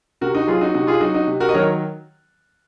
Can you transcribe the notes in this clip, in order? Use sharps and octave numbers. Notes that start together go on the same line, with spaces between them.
C3 F#4 A#4
D#4 F#4
F#3 F4 G#4
D#4 F#4
C3 D#4 F#4
F4 G#4
F#3 D#4 F#4
D#4 F#4
C3
F#4 A#4
D#5
D#3 F#3 A#4 C#5